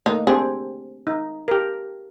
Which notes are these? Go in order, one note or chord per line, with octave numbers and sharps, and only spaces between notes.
A3 A#3 D#4
C4 D4 G4 G#4
D#4
G4 A#4